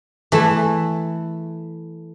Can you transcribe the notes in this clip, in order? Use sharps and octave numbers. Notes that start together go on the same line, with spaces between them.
E3 A3 E4 A5